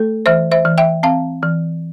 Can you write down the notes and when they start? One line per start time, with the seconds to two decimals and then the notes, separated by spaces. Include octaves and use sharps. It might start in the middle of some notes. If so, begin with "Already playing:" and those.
Already playing: A3 A4
0.26 E3 C5 E5
0.51 C5 E5
0.65 E3
0.78 E5 G5
1.03 C4 F5 A5
1.43 E3